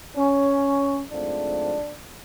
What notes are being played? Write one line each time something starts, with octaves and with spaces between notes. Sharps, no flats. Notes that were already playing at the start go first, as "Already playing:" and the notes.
C#4
G#2 F3 A3 C4 D4